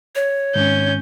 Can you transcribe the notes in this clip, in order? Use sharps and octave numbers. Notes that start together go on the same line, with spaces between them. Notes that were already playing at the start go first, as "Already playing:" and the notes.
C#5
G#1 C#4 G6